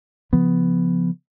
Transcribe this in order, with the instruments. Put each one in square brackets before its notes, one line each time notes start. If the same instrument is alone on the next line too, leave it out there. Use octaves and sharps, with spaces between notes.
[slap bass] C#3 F3 B3